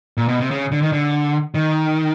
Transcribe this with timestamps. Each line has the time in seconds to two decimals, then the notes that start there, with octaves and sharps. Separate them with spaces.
0.17 A#2
0.28 B2
0.40 C3
0.51 C#3
0.72 D3
0.82 D#3
0.92 D3
1.54 D#3